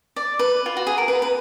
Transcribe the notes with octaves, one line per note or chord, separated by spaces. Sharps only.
D5
B4
F4
F#4
G#4
A#4
B4
B4